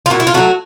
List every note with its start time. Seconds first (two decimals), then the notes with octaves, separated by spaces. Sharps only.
0.06 F4
0.10 A#2 F#4
0.20 E4
0.27 F4
0.34 F#3 A3 F#4